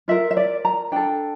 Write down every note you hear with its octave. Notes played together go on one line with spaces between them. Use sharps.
F4 A#4 E5
E5
D5
A#5
D4 A4 G5